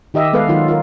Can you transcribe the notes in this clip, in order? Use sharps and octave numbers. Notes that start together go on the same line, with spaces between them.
D#3 G4 D#5 E5
G#3 B3 A4 B4 F5
D#3 F#3 F4
F4 A#4